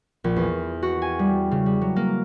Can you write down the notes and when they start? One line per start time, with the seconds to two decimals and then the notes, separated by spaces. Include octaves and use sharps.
0.24 A#1
0.36 E2
0.83 F#4
1.02 G#5
1.19 G3
1.51 C#3
1.66 G3
1.81 F#3
1.96 A#3